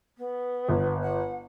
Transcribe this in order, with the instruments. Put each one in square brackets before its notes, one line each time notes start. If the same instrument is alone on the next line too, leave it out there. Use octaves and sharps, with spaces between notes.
[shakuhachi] B3
[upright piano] G1
[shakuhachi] F#5